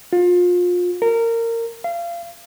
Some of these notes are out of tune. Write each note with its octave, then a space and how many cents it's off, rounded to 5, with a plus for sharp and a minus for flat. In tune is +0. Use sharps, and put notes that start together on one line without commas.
F4 +30
A#4 -20
F5 -30